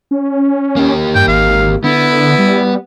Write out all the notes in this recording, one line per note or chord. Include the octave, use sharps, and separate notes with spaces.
C#4
A#3 G4
G2 G5
G#1 F5
D3 B3 E4
G3